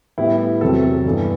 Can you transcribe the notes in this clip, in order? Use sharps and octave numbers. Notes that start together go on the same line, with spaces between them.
A2 G3 B3 E4
E2 C3 F#3 C4 A4
A4
G2 E3 B3